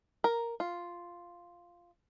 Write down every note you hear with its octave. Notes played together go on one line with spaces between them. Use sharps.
A#4
F4